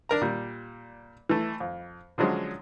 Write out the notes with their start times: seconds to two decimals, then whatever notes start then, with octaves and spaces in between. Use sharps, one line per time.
0.09 D4 A#4 A#5
0.22 A#2 G3
1.29 E3 A3
1.60 F2
2.18 D3 F3 F#3 G#3 C#4